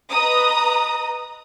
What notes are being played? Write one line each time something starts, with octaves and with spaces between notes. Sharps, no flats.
B4 D#5 A#5 D#6